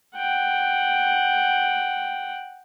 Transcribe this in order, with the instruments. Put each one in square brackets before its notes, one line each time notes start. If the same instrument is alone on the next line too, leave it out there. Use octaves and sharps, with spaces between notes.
[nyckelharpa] F#5 G5